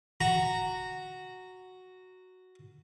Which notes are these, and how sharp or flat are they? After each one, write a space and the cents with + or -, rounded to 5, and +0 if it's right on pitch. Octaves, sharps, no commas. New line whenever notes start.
F#4 +0 A#5 -15